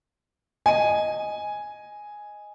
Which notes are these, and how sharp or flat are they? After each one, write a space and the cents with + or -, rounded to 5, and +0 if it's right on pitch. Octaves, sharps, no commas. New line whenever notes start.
D#5 +0 G#5 +0